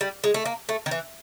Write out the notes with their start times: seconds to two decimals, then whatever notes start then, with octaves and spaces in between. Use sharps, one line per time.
0.01 G3
0.24 G#3
0.34 A3
0.45 A#3
0.69 A3
0.86 D#3
0.91 E3